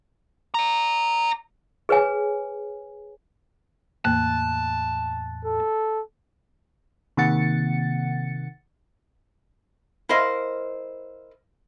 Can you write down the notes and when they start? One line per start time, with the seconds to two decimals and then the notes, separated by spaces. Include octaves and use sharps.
0.54 D5 A#5
1.89 G#4 B4 C#5 G#5
4.05 E2 A2 A#3 A5 F#6
5.45 A4
7.17 C3 D#3 A#3 F#5 A6 C#7
10.09 E4 A#4 C5 D#5 F5